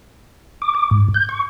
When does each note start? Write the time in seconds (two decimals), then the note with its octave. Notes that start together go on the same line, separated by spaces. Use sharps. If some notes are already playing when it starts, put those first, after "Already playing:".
0.62 D6
0.75 D6
0.91 G#2
1.14 G6
1.29 C#6